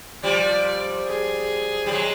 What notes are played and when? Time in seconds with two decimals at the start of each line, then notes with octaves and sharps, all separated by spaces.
0.23 F3 G3 D5
1.07 G#4
1.86 G3
1.91 F#3 G#3